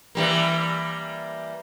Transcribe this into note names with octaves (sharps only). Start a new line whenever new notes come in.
E3 G3 A#3